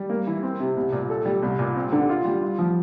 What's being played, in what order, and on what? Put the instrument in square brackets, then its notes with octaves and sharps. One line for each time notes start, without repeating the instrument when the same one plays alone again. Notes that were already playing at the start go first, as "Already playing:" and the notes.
Already playing: [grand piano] G3
A#3
E3
C4
C3
C2
A#2
A4
G3
C2
A#2
C4
D3
F4
G3
F4
F3